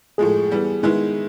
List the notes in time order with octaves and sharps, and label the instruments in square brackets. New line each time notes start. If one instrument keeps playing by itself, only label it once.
[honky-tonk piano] A2 F3 G#3 [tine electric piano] G#4
[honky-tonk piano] E3 G3 B3
D#3 G#3 B3 E4